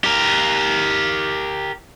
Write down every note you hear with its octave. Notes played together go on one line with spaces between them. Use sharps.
G4 A#4